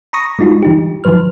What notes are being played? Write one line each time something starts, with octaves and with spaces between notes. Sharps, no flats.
A#5 B5 C#6 D#6 A#6
G3 G#3 D#4 F4 F#4
E3 D#4 G4
D#3 F3 F#3 B4 F6